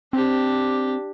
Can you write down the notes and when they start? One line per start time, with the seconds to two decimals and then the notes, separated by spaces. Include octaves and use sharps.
0.13 C4 D4 G4